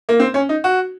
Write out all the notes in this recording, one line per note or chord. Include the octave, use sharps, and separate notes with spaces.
A#3
C4
C#4
D#4
F#4